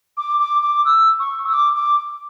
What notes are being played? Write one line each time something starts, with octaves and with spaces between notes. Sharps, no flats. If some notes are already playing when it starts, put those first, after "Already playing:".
D6
D6
D6
E6
C#6
E6
D6
D6